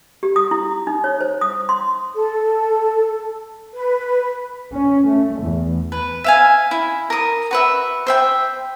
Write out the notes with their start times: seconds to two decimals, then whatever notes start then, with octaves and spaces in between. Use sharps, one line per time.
0.23 G4
0.36 D#6
0.51 E4
0.87 D#4
1.04 C#5
1.21 C5
1.41 D#6
1.69 C6
2.15 A4
3.73 B4
4.71 C#4
5.05 A3
5.40 E2
5.92 B4
6.24 E5 F5 G#5
6.71 E4
7.10 A#4 D#6
7.51 F#4 B4 E5
8.07 C5 E5 G5